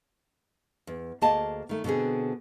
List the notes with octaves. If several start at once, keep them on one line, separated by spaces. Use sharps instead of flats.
E2
D2 A#3 G#4 D#5 A5
D#3 A3
B2 D3 B3 C4 G#4